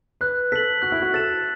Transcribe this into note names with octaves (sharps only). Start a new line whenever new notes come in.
B4 F#6
A4 B6 F#7
F#4 F#6
E4
F#4
A4 A6 E7